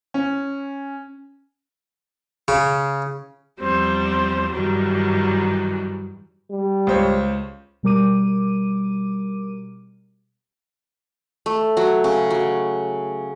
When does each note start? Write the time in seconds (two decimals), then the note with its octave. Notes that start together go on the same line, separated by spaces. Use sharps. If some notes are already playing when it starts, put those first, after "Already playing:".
0.14 C#4
2.48 C#3
3.60 E2 F3 G3 C4 C5
4.53 G2 D#3 E3 F#3 G3
6.51 G3
6.87 C#2 C5 C#5
7.83 B2 G3 A#4 D6 D#7
11.46 A3
11.77 F#3
12.04 C#3
12.30 F#3